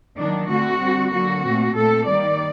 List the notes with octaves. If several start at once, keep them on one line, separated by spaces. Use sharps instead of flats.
D#3 F#3 A#3 D4
D3 A3 C4 F#4
D3 G3 C4
D3 F#3 A#3 F#4
A#2 A3 C4
A#2 A3 C4 A4
D#3 G3 A#3 D5